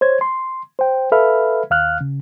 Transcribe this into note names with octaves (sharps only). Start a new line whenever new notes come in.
C5 C#5 G#6
C6
C5 G5
A4 B4 E5 F5 B5 F6
D#2 F5 F6 F#6
C#3